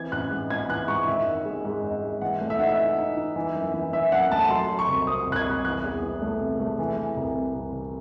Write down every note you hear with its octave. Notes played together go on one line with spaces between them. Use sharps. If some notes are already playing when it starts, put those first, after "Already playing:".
Already playing: E3 C4 G#6
A1 F#6
G#2
E3 G#6
E3 F#6
G#2 C#6
D#3 E5
G#1
G#3
G#2
G#1
G#2
E3 F#5
A3
E5
D#4 F#5
E5
E3
D#4
D#4
E3
F#2
E3
E3 E5
F#2 F#5
A3 A5
A5
F#3 C6
F#3
C#6
C2
C4 D#6
C2
F#6
G#6
C2
E3 F#6
E2
E3
A3
C3
A3
E3
E3
C2
C3
C2
C3